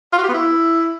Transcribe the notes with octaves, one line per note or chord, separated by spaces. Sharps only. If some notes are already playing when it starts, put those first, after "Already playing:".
F4
F#4
G4
B3
E4